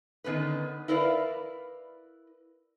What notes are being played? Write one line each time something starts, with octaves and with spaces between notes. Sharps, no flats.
D3 D#3 B3 C#4 B4
E4 A#4 B4 D5 F5